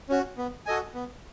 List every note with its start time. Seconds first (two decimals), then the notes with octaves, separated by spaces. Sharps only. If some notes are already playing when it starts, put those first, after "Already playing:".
0.09 C#4 F#4
0.37 B3
0.66 F#4 A4 D#5 G#5
0.94 B3